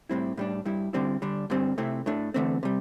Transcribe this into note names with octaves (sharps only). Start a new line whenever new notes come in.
A2 G3 C4 E4
A2 G3 D4
G2 G3 E4
D3 G3 C4 E4
D3 G3 D4
G2 D3 G3 C4
C3 A3 C4 E4
A2 A3 D4
E2 D3 A3 C4
C3 G3